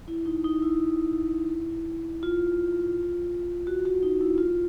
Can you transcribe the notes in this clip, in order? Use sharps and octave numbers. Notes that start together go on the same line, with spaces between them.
E4
D#4
D#4
E4
F4
F#4
F#4
D#4
E4
F4